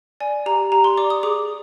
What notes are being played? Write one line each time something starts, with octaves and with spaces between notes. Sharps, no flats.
D5 G#5
G4 A#5
G4 A#5
C6
D5 D6
D#6
G#4 D6